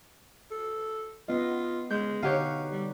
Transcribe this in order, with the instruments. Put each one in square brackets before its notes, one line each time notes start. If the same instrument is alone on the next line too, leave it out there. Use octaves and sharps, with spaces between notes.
[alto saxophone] A4
[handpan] B3 D#5 [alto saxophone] F4
[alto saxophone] G#3 [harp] G6
[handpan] B2 D3 F#5 [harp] D#4 G4 C#5 [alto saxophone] F5
[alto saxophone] G3